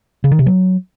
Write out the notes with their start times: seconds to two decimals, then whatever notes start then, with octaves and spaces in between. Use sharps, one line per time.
0.24 C#3
0.31 D#3
0.39 C3
0.46 F#3